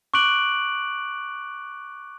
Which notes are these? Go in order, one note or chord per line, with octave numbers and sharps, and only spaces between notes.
C#6 D6 F#6 D7 F#7